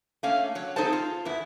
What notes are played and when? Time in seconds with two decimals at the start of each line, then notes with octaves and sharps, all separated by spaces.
0.23 A3 A#3 C#4 F5
0.55 F#3 C#5
0.76 C4 D#4 G#4 A4 C5 A5
0.93 F4
1.25 E2 B3 E4